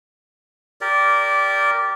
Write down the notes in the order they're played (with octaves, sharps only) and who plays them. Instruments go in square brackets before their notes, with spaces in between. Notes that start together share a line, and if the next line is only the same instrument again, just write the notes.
[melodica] G4 A#4 D5